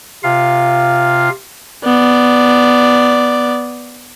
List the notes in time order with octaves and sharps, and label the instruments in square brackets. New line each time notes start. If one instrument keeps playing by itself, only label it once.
[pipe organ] C3 F4 F5
[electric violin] B3 D5